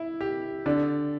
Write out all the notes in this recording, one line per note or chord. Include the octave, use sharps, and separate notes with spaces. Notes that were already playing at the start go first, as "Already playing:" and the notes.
Already playing: E4
G4
D3 D5